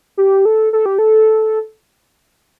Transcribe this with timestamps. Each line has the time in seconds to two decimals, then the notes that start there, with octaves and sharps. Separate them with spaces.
0.17 G4
0.45 A4
0.73 A4
0.86 G4
0.99 A4